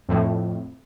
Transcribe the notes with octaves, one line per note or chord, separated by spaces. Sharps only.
F2 A2